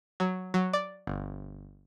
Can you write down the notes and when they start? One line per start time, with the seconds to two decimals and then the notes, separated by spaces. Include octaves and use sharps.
0.20 F#3
0.54 F#3
0.73 D5
1.07 G1